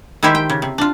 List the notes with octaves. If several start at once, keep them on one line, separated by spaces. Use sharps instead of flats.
D#3 G#3 E4 G4 C5 E5
G5
C#3
C3
D4 F4